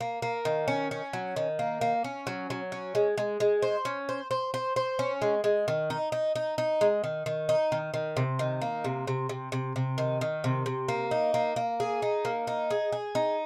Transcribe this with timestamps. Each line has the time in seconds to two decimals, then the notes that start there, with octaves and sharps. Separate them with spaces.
0.01 A#3
0.22 A#3
0.45 D#3
0.68 C#4
0.91 C#4
1.13 F#3
1.36 D#3
1.59 A#3
1.81 A#3
2.04 C#4
2.27 F#3
2.50 F#3
2.72 C#4
2.95 G#3
3.18 G#3
3.40 G#3
3.62 C5
3.85 C#4
4.09 C5
4.31 C5
4.54 C5
4.76 C5
4.99 C#4
5.22 G#3
5.44 G#3
5.68 D#3
5.90 D#4
6.12 D#4
6.36 D#4
6.58 D#4
6.81 G#3
7.04 D#3
7.26 D#3
7.49 D#4
7.72 D#3
7.94 D#3
8.17 C3
8.39 D#3
8.62 A#3
8.84 C3
9.07 C3
9.29 C3
9.52 C3
9.76 C3
9.98 D#3
10.21 D#3
10.44 C3
10.66 C3
10.89 A#3
11.11 D#4
11.34 A#3
11.56 A#3
11.80 G#4
12.02 D#4
12.25 A#3
12.47 D#4
12.70 G#4
12.92 G#4
13.15 D#4